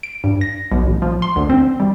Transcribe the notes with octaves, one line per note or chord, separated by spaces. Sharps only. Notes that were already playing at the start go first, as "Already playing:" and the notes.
D7
G2
A#6
B1
A1
F3
C6
D2
C4
G3